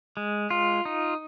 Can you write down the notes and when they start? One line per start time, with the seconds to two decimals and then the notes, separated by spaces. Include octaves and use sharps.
0.17 G#3
0.50 F4
0.85 D#4